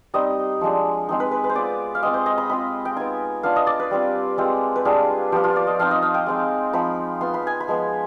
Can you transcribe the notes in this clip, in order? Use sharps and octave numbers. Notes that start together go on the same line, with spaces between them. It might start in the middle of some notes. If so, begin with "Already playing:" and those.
G3 C4 D#4 D#5
F3 G#3 D4
G#3 C4 D#4
B4
B4
B4
C5
B3 F4 D5
F5
G#3 C4 F4 D#5
C5
D#5
B5
G#3 C4 F4 B5
G5
B3 D#4 G#5
B3 D4 F4 F5
D#5
D5
B4
G3 C4 F4
G#3 C4 F4
B4
G3 D4 F4 G#4
F3 B3 F4 G4
F4
D5
D#5
F3 C4 D#4 F5
D#5
F5
G5
G#3 C4 D#4
F3 C4 D#4 B5
B3 F4 C6
B5
G#5
B5
F3 G#3 B3